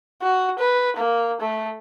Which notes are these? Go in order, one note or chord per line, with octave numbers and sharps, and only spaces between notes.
F#4
B4
A#3
A3